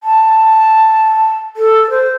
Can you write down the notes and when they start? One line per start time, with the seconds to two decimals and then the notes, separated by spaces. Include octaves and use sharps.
0.03 A5
1.56 A4
1.90 C5